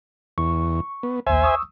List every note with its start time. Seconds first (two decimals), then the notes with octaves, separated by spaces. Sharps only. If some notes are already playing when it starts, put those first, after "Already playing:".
0.38 E2 C#6
1.03 B3
1.27 A#1 D#2 C5 E5 G#5
1.43 C#6 D#6 E6